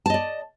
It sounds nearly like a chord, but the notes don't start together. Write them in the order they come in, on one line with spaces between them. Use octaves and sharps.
A5 D#5 D5